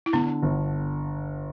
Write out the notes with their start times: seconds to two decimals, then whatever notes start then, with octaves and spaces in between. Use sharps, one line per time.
0.06 E4
0.13 D3 B3 D4
0.42 G1